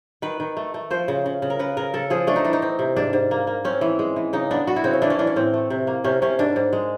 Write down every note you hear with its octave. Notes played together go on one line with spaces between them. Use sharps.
D#3 B4
D#3
A3
A3
F3 C5
C#3
C#3
C#3
A#4
C#3 B4
C#3 A#4
C#3 A4
F3 G#4
A3 D4
D#4
E3 D4
D#4
C4
C3
G#2 D4
G#2
A#3
A#3
C4 C#4
E3
G#3
E3
C#3 D#4
B3 D4
B3 F#4
E4
C#3 C4
C#4
E3 D4
C#4
E3 D4
C#4
A2 C4
A3
C3
A#3
C3 C#4
C3 C#4
G#2 D4
G#2
G#3